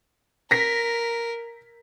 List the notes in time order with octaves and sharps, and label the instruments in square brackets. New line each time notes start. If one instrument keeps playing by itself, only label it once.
[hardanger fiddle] A#4 [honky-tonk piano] A#6 B6